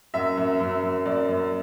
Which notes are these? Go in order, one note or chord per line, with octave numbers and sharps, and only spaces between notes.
F#2 E5
F#2
F#2
F#2
F#2 D5
F#2